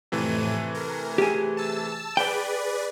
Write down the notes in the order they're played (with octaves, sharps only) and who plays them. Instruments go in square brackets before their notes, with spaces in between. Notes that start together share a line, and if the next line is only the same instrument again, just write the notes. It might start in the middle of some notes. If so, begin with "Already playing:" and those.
[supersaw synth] F2 A2 D#7 [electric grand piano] C3 E3 A3
[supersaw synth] A#4
[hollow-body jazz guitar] G4 G#4
[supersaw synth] A5 E6
[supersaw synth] G#4 B4 D5 [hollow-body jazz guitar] G5